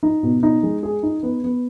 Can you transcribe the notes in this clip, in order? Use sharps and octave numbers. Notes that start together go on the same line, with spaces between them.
D#4
B2
D#4
G#3
G#4
D#4
B3
B3